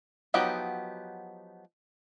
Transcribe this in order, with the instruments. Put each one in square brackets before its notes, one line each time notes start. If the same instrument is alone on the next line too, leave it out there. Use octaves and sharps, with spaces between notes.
[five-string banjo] F3 F#3 B3 D#4 G4